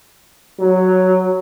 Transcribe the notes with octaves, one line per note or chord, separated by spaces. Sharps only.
F#3